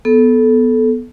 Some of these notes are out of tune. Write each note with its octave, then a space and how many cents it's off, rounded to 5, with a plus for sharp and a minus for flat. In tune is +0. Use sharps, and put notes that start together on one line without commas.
B3 +0 A4 -15